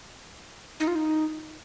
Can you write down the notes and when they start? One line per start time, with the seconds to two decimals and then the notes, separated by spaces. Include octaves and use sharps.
0.80 D#4
0.87 F4
0.95 D#4